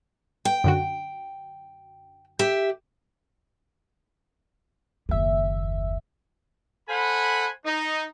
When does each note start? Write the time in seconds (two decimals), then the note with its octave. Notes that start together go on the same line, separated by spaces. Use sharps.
0.45 G5
0.64 F#2 D3 F#4
2.39 G4 E5
5.09 F#1 D#2 A#3 E5
6.88 A4 C5 F#5 G#5 B5
7.64 D#4